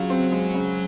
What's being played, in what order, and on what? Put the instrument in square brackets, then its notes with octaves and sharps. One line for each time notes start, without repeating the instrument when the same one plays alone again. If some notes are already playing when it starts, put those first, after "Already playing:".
Already playing: [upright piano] C#3 F4 [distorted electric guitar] F#3
[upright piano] C4
G#3
C#3